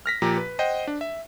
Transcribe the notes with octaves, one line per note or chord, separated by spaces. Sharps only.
F6 A#6 B6
A#2 F3 G4 A#5
B4
C5 D#5 F#5 G5
D4
E5